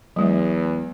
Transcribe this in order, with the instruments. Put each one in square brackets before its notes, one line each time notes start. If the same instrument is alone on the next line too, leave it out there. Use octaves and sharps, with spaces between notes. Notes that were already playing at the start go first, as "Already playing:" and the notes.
[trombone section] E2 [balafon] F#3 G#3